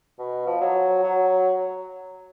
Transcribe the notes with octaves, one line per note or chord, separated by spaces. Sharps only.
B2
F3
F#3
F#3